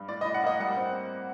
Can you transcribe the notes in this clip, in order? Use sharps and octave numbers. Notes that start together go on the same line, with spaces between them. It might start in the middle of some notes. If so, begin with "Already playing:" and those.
Already playing: G2
A2 D5
A2 D#5
F#5
A#3 D#5
G3 F#5
C4